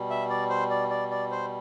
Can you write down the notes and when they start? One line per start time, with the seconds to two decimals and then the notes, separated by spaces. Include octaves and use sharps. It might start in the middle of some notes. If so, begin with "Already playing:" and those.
Already playing: B2 G3
0.10 E5
0.30 D5
0.50 C5
0.70 D5
0.90 D5
1.11 D5
1.31 C5